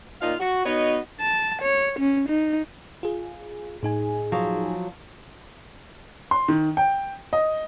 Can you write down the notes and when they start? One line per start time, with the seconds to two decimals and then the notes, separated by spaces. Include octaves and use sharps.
0.21 A#2 D#4 F4 F5
0.40 F#4
0.66 B3 D#4 F#4 C#5 D#5
1.20 A5
1.62 C#5
1.99 C#4
2.29 D#4
3.03 F4 G#4
3.83 A2 D#4 G#4 G#5
4.32 F3 F#3
6.31 C6
6.48 D#3
6.77 G5
7.33 D#5